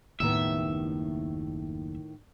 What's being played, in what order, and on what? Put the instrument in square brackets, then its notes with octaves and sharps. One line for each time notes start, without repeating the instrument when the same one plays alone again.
[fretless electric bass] F#1 D#2 B3 [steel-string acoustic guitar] A2 D#3 [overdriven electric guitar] E5